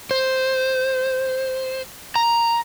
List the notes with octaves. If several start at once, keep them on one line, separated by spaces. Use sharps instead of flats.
C5
A#5